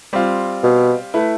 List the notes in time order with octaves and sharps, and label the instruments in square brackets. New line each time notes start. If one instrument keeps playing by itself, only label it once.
[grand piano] G3 C4 F4
[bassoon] B2
[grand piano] A3 E4 B4